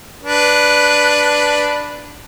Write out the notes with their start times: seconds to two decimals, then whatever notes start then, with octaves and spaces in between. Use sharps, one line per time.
0.23 D4 B4